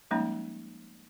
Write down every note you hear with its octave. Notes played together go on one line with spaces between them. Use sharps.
F3 G3 G#3 A#3 C#4 D#4